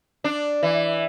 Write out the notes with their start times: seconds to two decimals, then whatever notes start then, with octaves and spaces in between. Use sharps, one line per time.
0.24 D4
0.63 E3